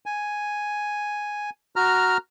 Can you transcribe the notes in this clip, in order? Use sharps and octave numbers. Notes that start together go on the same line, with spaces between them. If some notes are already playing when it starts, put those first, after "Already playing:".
G#5
F#4 A#5 F6